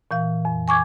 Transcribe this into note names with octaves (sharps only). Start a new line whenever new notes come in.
A#2 E3 F5
F2
G#5 C#6 D6 G#6